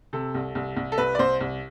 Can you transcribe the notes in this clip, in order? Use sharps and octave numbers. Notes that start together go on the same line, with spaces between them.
C3 A4
C2
C2
C2
A4
C2 B4
D5
C2 C5
C2